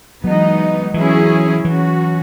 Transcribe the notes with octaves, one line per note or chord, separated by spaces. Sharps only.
E3 F#3 G#3 B3 D#4
E3 F#3 C#4 E4 G#4
E3 F#3 C#4 F#4